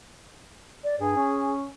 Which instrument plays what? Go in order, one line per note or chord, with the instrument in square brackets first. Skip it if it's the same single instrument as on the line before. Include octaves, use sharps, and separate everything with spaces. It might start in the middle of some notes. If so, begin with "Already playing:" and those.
[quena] D5
[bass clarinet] G2 [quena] G#4
[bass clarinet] C#4